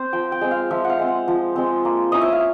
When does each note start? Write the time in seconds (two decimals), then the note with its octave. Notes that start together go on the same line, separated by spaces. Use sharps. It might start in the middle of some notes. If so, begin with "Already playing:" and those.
Already playing: C4 C5
0.13 F3 G5
0.32 G5
0.41 G#3 C4
0.51 F5
0.71 F3 E5
0.84 F#5
0.90 F5
0.99 G#3 C4
1.08 F#5
1.28 F3
1.56 G#3 C4
1.85 A#3
2.12 C#4 E4 D#5
2.21 E5
2.32 F5